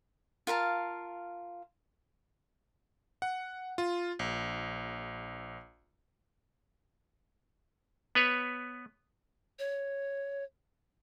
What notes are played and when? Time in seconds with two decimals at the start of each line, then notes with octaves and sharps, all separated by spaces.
0.47 F4 A#4 F5 A5
3.22 F#5
3.78 F4
4.19 A#1
8.15 B3 B4 C#5
9.59 C#5